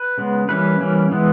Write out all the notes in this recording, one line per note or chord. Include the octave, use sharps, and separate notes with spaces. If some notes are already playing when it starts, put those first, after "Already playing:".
Already playing: B4
C#3 G#3 B3
E3 G3 A#3 C#4 B4
E3 G3 A#3 C#4
E3 G#3 B3